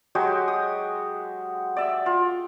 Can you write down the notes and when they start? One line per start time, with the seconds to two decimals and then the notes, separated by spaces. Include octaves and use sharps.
0.15 F#3 G#3 F#4 G4
0.48 D#6
1.77 D5 E5
2.06 F4